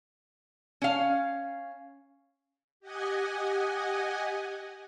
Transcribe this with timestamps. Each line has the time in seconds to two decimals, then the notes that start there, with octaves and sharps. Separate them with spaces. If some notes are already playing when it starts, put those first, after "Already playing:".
0.82 C#4 F5
2.80 G4 D#5 F#5 G#5